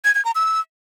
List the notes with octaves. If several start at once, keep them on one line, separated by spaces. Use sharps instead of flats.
G#6
G#6
A#5
E6